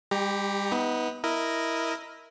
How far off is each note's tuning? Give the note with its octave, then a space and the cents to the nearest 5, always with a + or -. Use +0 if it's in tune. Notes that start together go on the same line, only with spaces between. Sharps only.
G3 +40 G4 +0 A#5 +10
B3 +0 D#4 +35
E4 -5 A#4 +0 D#5 +0